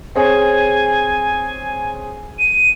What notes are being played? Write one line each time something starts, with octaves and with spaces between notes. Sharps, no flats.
C4 G#4 C#5 G#5
D#7